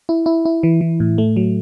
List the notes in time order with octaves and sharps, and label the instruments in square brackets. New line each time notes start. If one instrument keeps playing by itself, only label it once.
[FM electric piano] E4
E4
E4
E3
E3
A2
A3
F#3